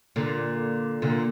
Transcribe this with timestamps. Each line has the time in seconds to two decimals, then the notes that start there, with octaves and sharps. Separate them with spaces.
0.16 A#2 D3
1.02 A#2 D3